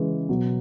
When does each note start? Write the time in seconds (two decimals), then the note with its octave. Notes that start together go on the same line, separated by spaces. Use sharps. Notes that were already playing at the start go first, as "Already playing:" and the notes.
Already playing: C#3 E3 G#3
0.29 B2 F#3